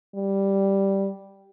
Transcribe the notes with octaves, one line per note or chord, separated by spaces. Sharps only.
G3